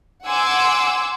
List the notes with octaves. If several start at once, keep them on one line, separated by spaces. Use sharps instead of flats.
F#5 G#5 C6 D6 E6